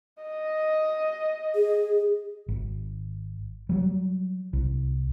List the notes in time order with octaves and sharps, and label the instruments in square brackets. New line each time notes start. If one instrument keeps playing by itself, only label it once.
[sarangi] D#5
[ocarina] G#4
[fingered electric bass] G#1
F#3 G3
C2